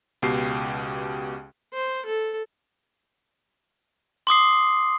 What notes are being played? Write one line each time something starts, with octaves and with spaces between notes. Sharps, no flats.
C#2 B2 G4 C7
C5
A4
C6 D6 D#6 C7